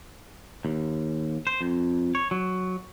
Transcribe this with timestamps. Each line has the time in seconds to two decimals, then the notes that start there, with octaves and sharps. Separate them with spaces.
0.65 D#2
1.47 C5
1.61 F2
2.15 C#5
2.31 F#3